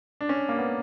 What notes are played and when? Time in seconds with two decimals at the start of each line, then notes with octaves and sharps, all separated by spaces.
0.21 D4
0.29 C#4
0.49 A#3
0.58 B3